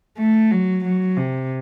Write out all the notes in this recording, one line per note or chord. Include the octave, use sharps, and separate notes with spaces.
A3
F#3
F#3
C3